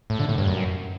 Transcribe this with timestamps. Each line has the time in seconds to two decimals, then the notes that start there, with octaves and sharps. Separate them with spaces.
0.10 A2
0.19 D3
0.29 A2
0.38 G2
0.47 F#2